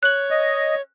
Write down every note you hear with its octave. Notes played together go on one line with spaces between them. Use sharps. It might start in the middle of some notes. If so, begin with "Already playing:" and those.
C#5 F#6 F#7
D#5